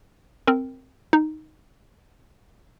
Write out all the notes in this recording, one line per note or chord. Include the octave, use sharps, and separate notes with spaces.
C4 A#4
D#4